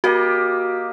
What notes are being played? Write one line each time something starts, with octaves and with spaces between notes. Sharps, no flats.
A#3 F#4 G4 D#5